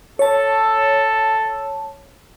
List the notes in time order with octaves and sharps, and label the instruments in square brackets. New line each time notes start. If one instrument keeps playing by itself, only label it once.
[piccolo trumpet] A4 [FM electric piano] C#5 A5